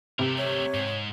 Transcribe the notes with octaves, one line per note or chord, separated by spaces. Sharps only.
C3 A3 A#4
C#5
G#2